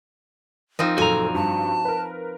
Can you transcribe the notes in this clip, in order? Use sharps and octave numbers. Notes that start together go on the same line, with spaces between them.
F3 C4 D#4
F#1 A#2 F#4 A4 G#5 A#5 F7
G2 A5
A#4 B4